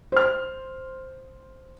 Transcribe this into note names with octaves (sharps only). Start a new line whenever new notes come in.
C5 F6